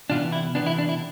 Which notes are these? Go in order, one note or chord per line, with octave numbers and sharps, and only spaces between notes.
C3 E3 B3 D4 F4
E4
C3 E3 B3 D4
E4
D4
E4